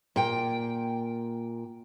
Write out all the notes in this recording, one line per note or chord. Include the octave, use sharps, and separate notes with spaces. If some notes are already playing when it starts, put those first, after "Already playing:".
A#2 G5